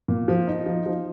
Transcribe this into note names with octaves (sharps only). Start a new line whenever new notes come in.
A#2
F3
D#4
F3
F3